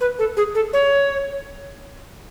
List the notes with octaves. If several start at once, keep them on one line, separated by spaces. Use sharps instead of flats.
B4
A4
G#4
A4
C#5